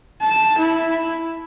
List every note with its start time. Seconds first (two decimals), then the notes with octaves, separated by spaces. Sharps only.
0.21 A5
0.59 E4